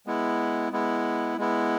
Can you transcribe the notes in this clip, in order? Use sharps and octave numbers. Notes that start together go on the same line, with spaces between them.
G#3 B3 E4
G#3 B3 E4
G#3 B3 E4